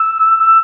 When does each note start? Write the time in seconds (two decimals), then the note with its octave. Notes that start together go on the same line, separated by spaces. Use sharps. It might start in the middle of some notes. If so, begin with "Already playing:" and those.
Already playing: E6
0.40 E6